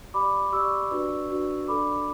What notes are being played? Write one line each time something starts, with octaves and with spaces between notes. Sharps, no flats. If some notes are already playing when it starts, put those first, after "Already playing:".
G4 D5 B5 D6
G4 D5 C#6 E6
D4 F#4 B4 D5
D4 F#4 B4 D5
D4 A4 D5 B5 D6